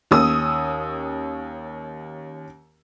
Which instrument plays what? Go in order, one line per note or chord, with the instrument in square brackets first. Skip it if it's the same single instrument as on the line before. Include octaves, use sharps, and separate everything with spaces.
[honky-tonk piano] D#2 C#4 D#6 E6